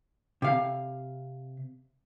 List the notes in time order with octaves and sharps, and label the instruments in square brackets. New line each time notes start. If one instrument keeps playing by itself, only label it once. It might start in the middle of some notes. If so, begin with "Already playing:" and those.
[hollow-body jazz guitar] C3 F5